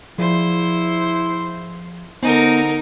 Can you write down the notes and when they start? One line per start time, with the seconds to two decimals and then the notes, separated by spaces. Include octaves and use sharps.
0.18 F3 E4 G#4 C5 D5
2.23 D3 B3 D#4 A#4 C5 G#5